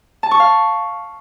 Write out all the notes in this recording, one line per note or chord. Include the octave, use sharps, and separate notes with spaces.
A5
C#6
F5